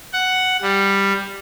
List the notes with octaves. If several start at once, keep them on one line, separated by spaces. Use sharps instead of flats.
F#5
G3